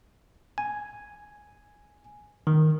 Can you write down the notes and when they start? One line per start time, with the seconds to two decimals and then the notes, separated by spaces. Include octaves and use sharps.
0.58 G#5
2.47 D#3